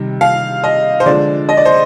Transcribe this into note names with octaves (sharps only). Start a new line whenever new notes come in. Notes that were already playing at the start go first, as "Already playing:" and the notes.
Already playing: C3 D#3 G3
F5
D#5
C5
D3 F3 G#3 D5
D#5
D5
C5